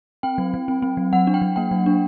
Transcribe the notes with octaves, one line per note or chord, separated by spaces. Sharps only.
C4 G5
F#3
F#3
C4
C4
F#3
F#3 F#5
D4
G5
F#3
A#3 G5
F#3
D4